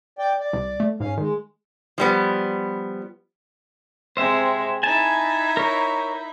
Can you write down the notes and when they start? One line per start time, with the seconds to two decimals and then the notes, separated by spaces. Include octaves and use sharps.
0.19 D5 G5
0.39 D5
0.53 C2
0.80 A3
1.00 G#2 C#4 F5
1.17 D#3 G#3
1.98 F3 G3 B3
4.17 C3 G#3 C4 C5 E5
4.83 D#4 E4 G#5 A5
5.57 A#4 C#5